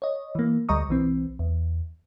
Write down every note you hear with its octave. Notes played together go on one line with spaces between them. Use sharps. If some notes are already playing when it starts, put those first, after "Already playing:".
C#5 D#5
E3 A#3
D2 G3 D#5 A#5 C#6 D#6
B1 E3 C4
E2